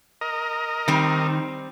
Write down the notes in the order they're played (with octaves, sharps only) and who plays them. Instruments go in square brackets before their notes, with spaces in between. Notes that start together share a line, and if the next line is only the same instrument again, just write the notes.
[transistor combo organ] A#4 D#5
[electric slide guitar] D#3 [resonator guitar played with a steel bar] G3 C4